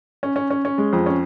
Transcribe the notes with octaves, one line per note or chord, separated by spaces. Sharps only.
C#4
C#4
C#4
C#4
G#3
F2
C#4